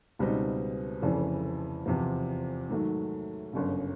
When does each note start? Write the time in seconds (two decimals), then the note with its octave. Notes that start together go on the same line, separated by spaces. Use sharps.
0.19 C#2 B2 G3 C4 D#4
1.02 F1 F2 C#3 E3
1.86 E2 C3 F3
2.69 G#2 D#3 F#3 A3
3.53 G1 F#2 C#3